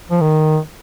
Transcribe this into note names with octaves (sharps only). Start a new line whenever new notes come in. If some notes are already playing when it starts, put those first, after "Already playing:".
F3
D#3